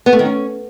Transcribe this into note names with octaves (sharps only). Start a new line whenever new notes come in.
B3
A3
D#3
C#4